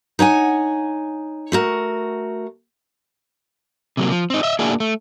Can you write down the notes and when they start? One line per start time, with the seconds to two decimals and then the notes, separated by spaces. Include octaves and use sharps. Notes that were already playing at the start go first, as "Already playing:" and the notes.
0.19 D#4 C#5 F#5 G#5
1.52 A3 F#4 A#4
3.97 C3 F#3 A#3
4.11 F3
4.30 C4 D#4
4.43 D#5 E5
4.59 A#3 D4 E4 F#4 G#4
4.80 A3